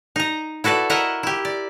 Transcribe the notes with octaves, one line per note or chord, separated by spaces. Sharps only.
D#4 A#5
E4 F#4 A4 B4 D5
E4 A#4 D#5 E5 F#5
E4 G4
D5